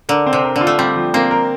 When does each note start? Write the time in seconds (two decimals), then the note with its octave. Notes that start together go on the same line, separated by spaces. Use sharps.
0.09 D3 A#4
0.26 C4
0.33 C3
0.44 A#4
0.56 D3
0.61 F4
0.67 A3
0.79 G3 C4
0.96 F3
1.14 A#3 C4
1.31 A#4